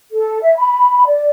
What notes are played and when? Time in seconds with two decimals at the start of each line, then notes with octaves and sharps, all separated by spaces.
0.11 A4
0.41 E5
0.56 B5
1.05 D5